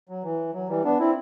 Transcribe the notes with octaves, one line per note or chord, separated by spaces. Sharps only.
F#3
E3
F#3
E3 G3
B3 D4
C4 E4